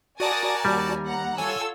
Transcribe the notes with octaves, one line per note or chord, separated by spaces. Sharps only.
F#4 A#4 D5 G#5 A5 D6 D#6 A6
D#2 G3
F#5 A#5
F4 A4 C#5 G#5 E6